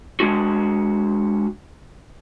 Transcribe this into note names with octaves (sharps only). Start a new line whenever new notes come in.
G#3 D4 F#4